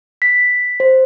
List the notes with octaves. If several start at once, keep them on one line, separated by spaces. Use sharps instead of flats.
B6
C5